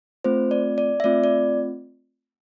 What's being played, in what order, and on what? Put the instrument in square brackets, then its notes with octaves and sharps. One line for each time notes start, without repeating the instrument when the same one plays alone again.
[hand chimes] A3 C4 F4 C5
D5
D5
E5
A3 C4 F4 D5
D5